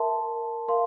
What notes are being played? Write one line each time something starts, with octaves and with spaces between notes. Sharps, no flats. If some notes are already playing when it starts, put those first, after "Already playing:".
Already playing: A#4 E5 A5 C6
A#4 F5 C6